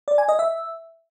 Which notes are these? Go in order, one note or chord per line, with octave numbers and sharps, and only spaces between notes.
D5
G#5
D#5
E5